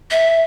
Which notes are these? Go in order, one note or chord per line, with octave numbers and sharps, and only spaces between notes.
E5